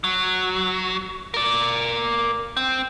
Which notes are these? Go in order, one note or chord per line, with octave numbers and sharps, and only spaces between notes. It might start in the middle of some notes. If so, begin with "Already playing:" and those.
F#3
A#4 D5
C4